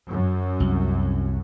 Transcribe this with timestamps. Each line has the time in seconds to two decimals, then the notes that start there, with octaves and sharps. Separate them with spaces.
0.11 F#2
0.60 C2